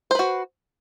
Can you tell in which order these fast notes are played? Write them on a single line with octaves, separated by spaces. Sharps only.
C5 B4 F#4